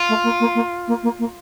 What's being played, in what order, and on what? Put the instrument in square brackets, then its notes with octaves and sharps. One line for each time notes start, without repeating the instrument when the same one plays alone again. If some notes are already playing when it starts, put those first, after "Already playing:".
Already playing: [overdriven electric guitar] F4
[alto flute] A3
A#3
A#3
A#3
A#3
A#3
A#3